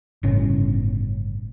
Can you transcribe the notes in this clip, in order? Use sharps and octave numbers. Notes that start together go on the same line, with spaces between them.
G1 A2 C#3 C#4